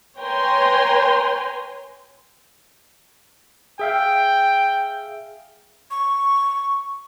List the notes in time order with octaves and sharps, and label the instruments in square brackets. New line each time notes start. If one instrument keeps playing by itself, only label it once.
[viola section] B4 C#5 G5 G#5 A#5 C6
[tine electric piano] G#4 E5 F5 [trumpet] G5
[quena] C#6